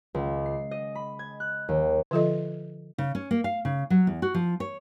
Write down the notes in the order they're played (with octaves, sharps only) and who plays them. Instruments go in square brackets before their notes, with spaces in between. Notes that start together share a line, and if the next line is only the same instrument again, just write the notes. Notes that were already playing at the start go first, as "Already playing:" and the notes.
[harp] C#2
C7
D#5
B5
G#6
F#6
D#2
[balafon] D3 F3 F4 A4 D#5
[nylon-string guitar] C#3
C#4
A#3
F5
C#3
F#3
E2
F#4
F3
C#5